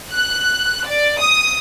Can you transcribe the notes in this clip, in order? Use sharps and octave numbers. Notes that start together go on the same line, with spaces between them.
F#6
D5
D#6